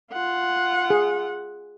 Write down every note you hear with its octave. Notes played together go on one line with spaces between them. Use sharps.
F4 F#5
G#4